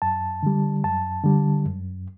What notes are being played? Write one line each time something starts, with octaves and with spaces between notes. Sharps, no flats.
F#2 A5
D3 G3
F#2 A5
D3 G3
F#2